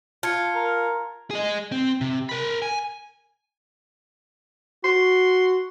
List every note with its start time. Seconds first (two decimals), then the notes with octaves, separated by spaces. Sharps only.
0.23 F4 A5 G#6 C#7
0.55 A#4
1.31 G#4 D#5
1.72 C4
2.01 C3
2.29 A#4 B5
2.62 G#5
4.84 F#4 C6